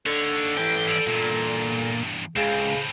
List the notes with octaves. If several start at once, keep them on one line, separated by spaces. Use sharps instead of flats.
D#2 D3 A4 C#5
E3 C#4 G5
G3 D5
E2 G2 A#2
C#2 A2 C#3 C4